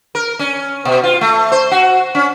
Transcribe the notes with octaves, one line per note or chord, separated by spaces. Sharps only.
A#4
C#4
B2
F4
A3
C5
F#4
C#4